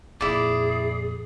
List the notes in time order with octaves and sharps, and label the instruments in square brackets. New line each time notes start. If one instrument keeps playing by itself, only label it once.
[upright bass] F2 A#2 [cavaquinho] E4 D5 [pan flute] G#4